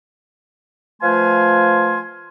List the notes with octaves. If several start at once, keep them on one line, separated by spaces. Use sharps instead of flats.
F3 A3 B4 F5 G#5 C6